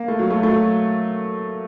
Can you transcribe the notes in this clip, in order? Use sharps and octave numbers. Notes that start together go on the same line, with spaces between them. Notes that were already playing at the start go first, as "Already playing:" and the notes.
Already playing: A#3
A3
F#3
A3
A3
F#3